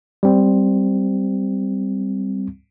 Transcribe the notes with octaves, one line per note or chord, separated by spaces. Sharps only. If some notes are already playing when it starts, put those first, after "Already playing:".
G3 C4